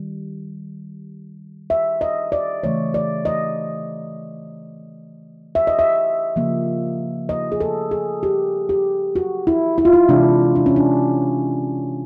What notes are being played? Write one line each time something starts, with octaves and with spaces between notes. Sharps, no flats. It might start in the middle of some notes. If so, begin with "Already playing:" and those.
Already playing: D#3 G3
E5
D#5
D5
C#3 E3 A3 C#5
D5
D#5
E5
D#5
E5
C#3 F3 A#3
D#5
G#4
A4
G#4
G4
G4
F#4
E4
E4
F4
E4
C3 E3 G#3 D4
D4
C#4
D4